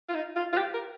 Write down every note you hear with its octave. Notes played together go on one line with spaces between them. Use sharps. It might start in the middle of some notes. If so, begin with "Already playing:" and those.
F4
D#4
F4
F4
G4
A#4